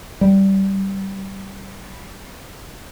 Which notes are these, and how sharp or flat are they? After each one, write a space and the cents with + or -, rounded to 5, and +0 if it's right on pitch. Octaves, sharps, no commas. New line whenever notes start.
G3 -15